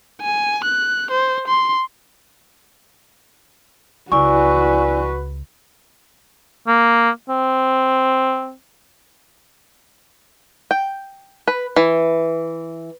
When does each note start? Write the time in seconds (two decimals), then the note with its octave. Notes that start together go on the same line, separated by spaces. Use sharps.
0.22 G#5
0.64 F#6
1.11 C5
1.48 C6
4.12 C#2 E4 F#4 B4 D5 G#5 C#6
6.67 A#3
7.29 C4
10.71 G5
11.48 B4
11.76 E3